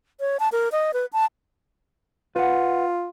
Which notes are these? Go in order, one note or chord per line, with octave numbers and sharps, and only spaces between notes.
C#5
A5
A#4
D#5
B4
A5
F4 B4 F#5